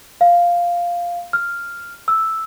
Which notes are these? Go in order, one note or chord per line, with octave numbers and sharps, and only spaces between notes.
F5
F6
E6